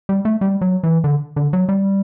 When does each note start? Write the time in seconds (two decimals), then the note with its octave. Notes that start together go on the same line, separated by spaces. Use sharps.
0.09 G3
0.25 A3
0.41 G3
0.61 F#3
0.83 E3
1.04 D3
1.36 D3
1.53 F#3
1.69 G3